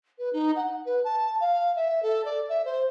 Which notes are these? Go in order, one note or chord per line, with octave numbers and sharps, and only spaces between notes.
B4
D#4
F#5
B4
A5
F5
E5
A4
D5
E5
C5